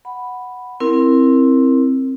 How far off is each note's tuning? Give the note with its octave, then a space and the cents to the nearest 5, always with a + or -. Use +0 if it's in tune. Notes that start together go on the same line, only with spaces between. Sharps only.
F#5 +0 B5 +0
C4 +10 E4 +0 A#4 +0